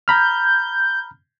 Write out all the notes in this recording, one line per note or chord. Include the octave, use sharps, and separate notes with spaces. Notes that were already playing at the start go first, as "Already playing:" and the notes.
A#5 B5 F6 G6